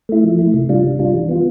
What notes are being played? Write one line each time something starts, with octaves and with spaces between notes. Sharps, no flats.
A3 E4
F3
A3 E4
C3
G3 D4 F4
C3
G3 D4 F4
E3
B3 F4